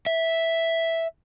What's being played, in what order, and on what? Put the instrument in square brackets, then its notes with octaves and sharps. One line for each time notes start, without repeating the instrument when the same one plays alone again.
[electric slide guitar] E5